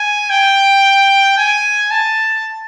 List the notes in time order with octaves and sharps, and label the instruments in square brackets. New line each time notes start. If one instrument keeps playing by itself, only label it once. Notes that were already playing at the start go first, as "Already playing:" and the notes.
Already playing: [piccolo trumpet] G#5
G5
G#5
A5